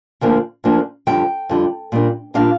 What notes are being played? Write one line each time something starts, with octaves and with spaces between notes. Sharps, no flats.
D2 D3 F3 A#3 D4
D2 D3 F3 A#3 D4
F2 D3 G3 G5
F2 D3 G3
A#2 G3 A#3 D4
A#2 G3 A#3 D4 F5